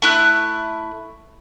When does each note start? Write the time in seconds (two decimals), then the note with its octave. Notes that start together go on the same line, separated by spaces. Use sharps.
0.02 A3 E4 F#6